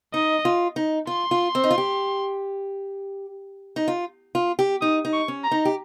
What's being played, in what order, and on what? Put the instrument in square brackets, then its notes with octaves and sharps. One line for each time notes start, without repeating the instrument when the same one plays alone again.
[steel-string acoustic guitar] D#4 [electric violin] D#5
[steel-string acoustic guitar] F4
D#4
[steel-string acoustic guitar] F4 [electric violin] C6
[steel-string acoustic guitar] F4
C4
D#4
F4
G4
D#4
F4
F4
G4
[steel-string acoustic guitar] D#4 [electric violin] D#6
[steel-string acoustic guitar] D#4
[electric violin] C#6
[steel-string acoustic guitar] C#4
[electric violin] A#5
[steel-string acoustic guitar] D#4
G4